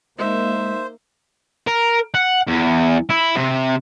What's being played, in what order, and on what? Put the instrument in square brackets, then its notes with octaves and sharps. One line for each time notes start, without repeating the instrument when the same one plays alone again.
[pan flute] G#3 [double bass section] A#3 [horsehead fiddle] D#4 E5 [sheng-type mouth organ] C5
[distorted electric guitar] A#4
F#5
E2
E4
C3